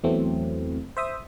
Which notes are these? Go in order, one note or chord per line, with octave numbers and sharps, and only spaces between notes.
E2 E3 F#3 A3 C4
C5 E5 D#6